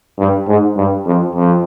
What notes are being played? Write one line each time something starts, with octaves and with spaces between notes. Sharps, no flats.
G2
G#2
G2
F2
F2